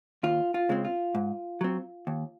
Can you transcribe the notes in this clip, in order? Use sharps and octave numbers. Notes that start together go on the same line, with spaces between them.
D#2 F4
F4
C#3 G#3 C4
F4
G#2
F#3 C4
D#2